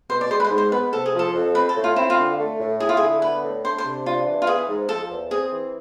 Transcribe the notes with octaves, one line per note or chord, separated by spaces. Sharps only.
B2 C5
D5
G#3 C5
B4
C5
G#2
C5
B3 B4
C3 A4
G#4
F3
A4
F2
C4 B4
A4
A2
F4
C4 E4
F4
D3
A3
A2
E4 G#4
F4
G#4
D3
B3 B4
A2
D4 C5
C5
C3
D4 F4
E3
F4
B3 G#4
G#2
F3 A4
E2
C4 G#4
E3